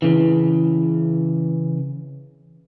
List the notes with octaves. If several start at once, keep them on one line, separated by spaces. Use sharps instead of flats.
C#3 E3